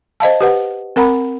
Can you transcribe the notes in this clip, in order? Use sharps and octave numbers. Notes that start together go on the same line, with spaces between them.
C5 D#5 F5 A5
G4 B4 F#5
C4 A#4 F#5 A#5 B5